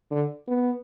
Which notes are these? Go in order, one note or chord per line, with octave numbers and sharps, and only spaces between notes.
D3
B3